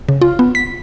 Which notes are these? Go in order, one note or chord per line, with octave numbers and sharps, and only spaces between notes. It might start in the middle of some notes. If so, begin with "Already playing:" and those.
C#3
F4
B3
B6